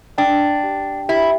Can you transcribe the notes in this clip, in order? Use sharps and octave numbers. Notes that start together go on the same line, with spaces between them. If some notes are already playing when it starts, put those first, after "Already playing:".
D4 G5
G4
E4 G4